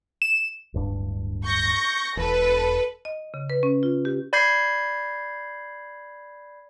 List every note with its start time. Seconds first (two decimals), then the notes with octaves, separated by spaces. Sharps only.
0.22 E7
0.74 D1 G2 D4
1.46 C#6 G6 A#6
2.17 E1 E2 A4 B4
3.05 D#5
3.34 C#3
3.50 B4
3.63 C#4
3.83 F4
4.05 G4
4.33 D5 B5 G6 G#6 C7